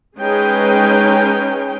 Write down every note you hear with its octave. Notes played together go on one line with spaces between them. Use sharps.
G#3 C#4 D#4 G#4 B4 G5